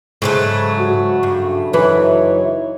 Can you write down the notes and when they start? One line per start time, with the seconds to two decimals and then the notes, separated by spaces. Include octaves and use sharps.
0.22 G#2 C#3 F#3 A3
0.78 F#4
1.23 G2
1.73 F#2 E3 D#4 F#4 B4 C#5